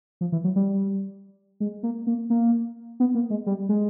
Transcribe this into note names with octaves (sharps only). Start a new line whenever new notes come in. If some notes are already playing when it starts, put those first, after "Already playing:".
F3
E3
F#3
G3
G#3
A#3
A#3
A#3
B3
A#3
G#3
G3
G#3